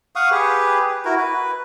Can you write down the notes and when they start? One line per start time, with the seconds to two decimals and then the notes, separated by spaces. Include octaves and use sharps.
0.16 F5 F#5 C#6 D#6
0.31 G4 G#4 B4
1.05 E4 F#4 A#4
1.17 B4